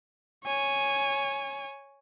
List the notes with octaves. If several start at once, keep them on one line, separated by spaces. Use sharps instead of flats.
C#5 G#5